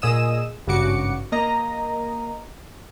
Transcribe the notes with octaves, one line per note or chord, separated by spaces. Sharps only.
A#2 G#4 D#5 D#6 E6 E7
G#1 G2 C#3 F#4 D6 C#7
A#3 D#5 A#5